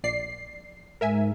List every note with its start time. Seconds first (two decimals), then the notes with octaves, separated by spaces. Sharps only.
0.04 A#1 D5 C7
1.01 G#2 A#4 E5 G#5